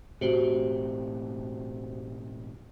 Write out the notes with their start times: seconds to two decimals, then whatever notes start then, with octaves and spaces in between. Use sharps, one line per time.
0.21 E1 A2 C3 F#4 G4 C5